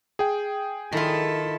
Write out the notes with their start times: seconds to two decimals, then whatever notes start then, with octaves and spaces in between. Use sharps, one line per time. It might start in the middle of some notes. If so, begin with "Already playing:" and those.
0.19 G#4 G5
0.92 D#3 E4 F4 A4